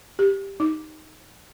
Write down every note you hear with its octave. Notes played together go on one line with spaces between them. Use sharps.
G4
D#4